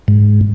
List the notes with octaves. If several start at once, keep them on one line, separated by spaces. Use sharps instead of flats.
G#2